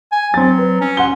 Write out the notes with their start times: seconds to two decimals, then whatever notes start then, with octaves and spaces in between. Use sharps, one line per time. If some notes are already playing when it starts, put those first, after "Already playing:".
0.12 G#5
0.34 F#3 C4 A6
0.58 B4
0.81 C#4
0.97 F#5 C6 G7